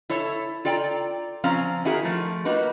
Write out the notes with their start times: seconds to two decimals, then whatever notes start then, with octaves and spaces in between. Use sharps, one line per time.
0.09 E4 A4 C#5 A5
0.65 F4 A4 D5 G5 A#5
1.44 F3 C4 C#4 F5 A#5
1.85 D#3 E4 F#4 G#4 A#4
2.05 F3 A3
2.45 A#3 D#4 F#4 B4